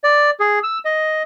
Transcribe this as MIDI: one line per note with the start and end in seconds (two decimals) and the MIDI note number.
0.04 0.30 74
0.40 0.59 68
0.63 0.78 88
0.85 1.23 75